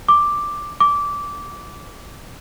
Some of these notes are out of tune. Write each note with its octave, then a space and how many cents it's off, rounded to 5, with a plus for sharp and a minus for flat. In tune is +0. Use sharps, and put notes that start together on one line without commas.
D6 +5
D6 -15